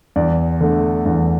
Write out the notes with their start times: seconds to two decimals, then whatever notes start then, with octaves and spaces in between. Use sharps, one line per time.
0.16 E2 D5
0.61 D3 A3
1.06 E2